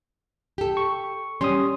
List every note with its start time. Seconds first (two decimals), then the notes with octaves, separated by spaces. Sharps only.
0.58 G4 A4
0.77 C#6
1.41 G3 C#4 C6 D#6